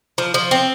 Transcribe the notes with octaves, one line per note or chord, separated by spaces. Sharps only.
F3
F3
C4